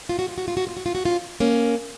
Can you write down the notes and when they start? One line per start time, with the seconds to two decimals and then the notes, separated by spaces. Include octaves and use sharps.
0.09 F4
0.19 F#4
0.28 F4
0.38 F#4
0.48 F4
0.57 F#4
0.67 F4
0.77 F#4
0.86 F4
0.95 F#4
1.05 C#4 F4
1.40 A#3 C#4